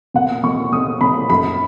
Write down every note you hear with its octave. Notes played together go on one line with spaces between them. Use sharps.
A#2 F#5
A#2 C#6
A#2 D#6
A#2 B5
F#2 B5